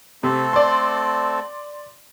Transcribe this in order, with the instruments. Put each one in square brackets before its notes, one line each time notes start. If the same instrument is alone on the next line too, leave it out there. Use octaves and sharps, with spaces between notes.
[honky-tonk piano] C3 [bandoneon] A3 C4 A4
[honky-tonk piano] D5 C6